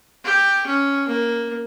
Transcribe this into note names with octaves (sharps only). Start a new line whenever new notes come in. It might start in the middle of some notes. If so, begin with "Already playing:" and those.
G4
C#4
A#3